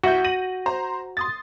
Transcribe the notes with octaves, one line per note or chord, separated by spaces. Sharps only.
C2 E4 F#4 G6
A#6 D#7 F#7
C5 A#5
C6 D#6 A6